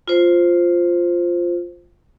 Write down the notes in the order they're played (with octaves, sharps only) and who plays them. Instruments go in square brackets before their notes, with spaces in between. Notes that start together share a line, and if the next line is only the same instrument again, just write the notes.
[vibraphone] F4 C5